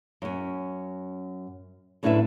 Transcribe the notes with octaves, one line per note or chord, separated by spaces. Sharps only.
F#2 C#4
F#2 A2 D4 E4 B4 E5